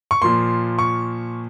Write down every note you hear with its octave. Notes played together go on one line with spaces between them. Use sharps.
C#6
A#2 F3 A#3 C6
C#6